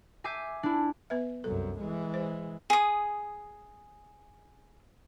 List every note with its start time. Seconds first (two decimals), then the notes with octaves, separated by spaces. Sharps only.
0.24 E5 G#5 D6 G6 C7 D#7
0.63 D4 E4
1.10 B3 B4 E5
1.44 C2 F#2 A4
1.80 E3 G#3
2.14 C5
2.70 G#4 D#6